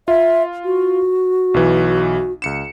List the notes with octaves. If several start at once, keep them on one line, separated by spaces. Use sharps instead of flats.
F4 E5
F#4
B1 E3
C#2 C#7 E7